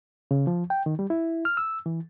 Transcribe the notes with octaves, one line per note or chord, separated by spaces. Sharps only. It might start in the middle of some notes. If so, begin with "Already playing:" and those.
C#3
F3
G5
D#3
G3
E4
F6
E6
E3